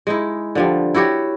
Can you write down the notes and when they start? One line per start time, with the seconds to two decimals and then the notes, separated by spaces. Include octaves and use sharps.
0.07 G#3 D#4 E4
0.55 D3 F3 G3
0.94 E4 F#4 G4 C#5